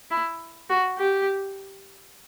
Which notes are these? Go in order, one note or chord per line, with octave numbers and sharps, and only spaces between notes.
E4
F#4
G4